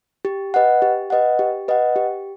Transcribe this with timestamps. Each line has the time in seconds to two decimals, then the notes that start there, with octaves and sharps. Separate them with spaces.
0.25 G4
0.54 B4 D#5 F#5
0.82 G4
1.10 B4 D#5 F#5
1.39 G4
1.68 B4 D#5 F#5
1.96 G4